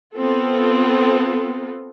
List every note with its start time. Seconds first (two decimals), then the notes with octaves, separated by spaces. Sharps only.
0.15 B3 C4 F4 A4